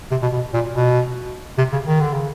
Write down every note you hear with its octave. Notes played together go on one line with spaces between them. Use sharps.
C3
B2
B2
A#2
B2
C3
C#3
D#3
D3
C#3